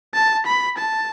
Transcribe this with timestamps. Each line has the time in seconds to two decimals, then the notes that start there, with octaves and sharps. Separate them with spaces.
0.14 A5
0.46 B5
0.78 A5